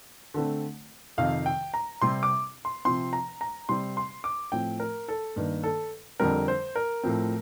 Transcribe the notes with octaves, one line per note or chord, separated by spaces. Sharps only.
D3 A3 C4
F2 C3 D#3 F5
G5
A#5
C3 G3 C4 C6
D6
C6
C3 F3 C4 C6
A#5
A#5
C3 G3 C4 C6
C6
D6
A2 F3 C4 G5
A#4
A4
G2 D#3 A#3
A4
F2 D3 G3 C4 A#4
C5
A#4
A2 F3 C4